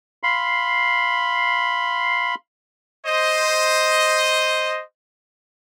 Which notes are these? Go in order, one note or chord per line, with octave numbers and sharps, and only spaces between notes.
F5 B5 C6
C5 D#5